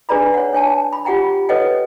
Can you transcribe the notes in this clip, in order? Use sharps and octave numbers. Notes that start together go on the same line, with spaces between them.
D4 G#4 B4 D5 A#5 B5
C#5 F#5
D4 C#5 G#5 A5
B5
F4 G4 F#5 G5 A#5
A4 B4 C#5 D#5 F#5 G5